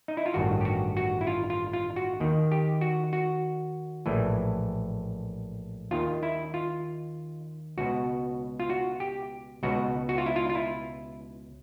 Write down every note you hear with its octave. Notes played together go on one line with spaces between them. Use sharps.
D#4
E4
F4
A1 G2 D#3 F#4
G4
F#4
F#4
E4
F4
F4
F4
F#4
D#2 D#3
G4
F#4
F#4
A#1 A2 E3
D#2 D#3 F4
E4
F4
C#2 B2 F#4
F4
F#4
G4
C#2 B2 F#4
F#4
F4
E4
F4
F4
E4